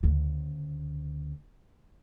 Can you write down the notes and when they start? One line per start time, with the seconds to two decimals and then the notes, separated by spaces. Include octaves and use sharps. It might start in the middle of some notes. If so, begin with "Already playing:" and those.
0.03 D2 C#3